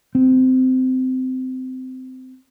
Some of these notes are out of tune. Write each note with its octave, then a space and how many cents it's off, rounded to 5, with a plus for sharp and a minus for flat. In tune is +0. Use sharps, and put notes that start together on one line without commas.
C4 -20